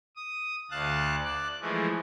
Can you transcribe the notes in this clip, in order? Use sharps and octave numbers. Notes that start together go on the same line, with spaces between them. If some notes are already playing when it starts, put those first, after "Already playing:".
D#6
D2 F5 A5 F#6
D5 F#6
E3 F3 G#3 A3